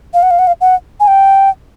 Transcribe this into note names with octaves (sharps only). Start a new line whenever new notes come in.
F5
F#5
F5
F#5
F5
F#5
G#5
G5